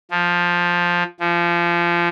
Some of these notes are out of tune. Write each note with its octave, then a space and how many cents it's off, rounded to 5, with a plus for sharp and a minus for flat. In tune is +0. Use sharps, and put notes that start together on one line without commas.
F3 +5
F3 -25